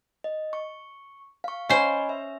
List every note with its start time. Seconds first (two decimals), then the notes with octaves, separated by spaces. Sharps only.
0.24 D#5
0.53 C#6
1.44 F5 C#6
1.69 C#4 C5 D#5 G#5 B5
2.09 E5